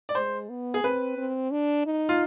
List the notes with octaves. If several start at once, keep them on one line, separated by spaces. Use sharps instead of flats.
D5
G#3 C5
B3
G#4
C4 B4
C4
D4
D#4
F4